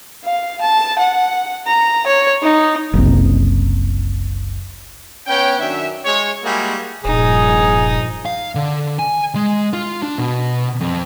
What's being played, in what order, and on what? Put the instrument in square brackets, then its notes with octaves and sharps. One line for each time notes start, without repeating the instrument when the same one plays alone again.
[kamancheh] F5
A5
F#5
A#5
C#5
D#4
[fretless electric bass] F#1 C2
[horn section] B3 C#4 C#5 G5
F#2 D#3 D4 E5
G#3 C#5
G3 G#3 A#3 E4 F#4 G#4
[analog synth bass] D#1 [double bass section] A#1 G2 F3 [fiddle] D#4 [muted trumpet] G#4
[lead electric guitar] F5
D3
G#5
G#3
F4
D4
B2
F2